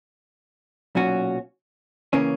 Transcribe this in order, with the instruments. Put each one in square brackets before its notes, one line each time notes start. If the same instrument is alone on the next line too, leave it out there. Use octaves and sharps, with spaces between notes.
[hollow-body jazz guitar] B1 A#2 F#3 C#4 F#4
C#3 E3 A#3 C#4